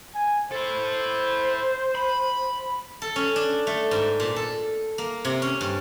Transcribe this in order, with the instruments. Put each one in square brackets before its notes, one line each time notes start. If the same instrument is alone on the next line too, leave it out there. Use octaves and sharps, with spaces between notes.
[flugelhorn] G#5
[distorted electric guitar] E4 A4 [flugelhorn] C5
[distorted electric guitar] B5
[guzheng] A4
C#4
D4
A3
G#2
A#2
A4
A#3
C3
C#4
G2